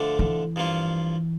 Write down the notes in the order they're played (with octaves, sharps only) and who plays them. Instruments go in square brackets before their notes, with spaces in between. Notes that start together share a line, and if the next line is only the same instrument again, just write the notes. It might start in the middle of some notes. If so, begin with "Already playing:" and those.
Already playing: [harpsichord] D3 F3 A3 D4
[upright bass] E3
[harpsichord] G2 F3 A#3 F4